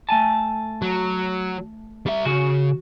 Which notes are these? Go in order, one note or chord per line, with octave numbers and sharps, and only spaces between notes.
A3 G#5 A5
F#3
G3 E5
C#3 F#4